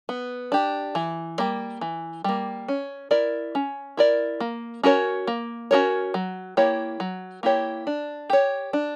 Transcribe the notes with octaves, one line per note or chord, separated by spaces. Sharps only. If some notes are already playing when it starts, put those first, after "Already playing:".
B3
D4 G4
E3
G3 A#3
E3
G3 A#3
C#4
E4 A#4 D5
C#4
E4 A#4 D5
A#3
C#4 F#4 A#4 C#5
A#3
C#4 F#4 A#4 C#5
F#3
A#3 E4 G4 C#5
F#3
A#3 E4 G4 C#5
D4
G4 C#5
D4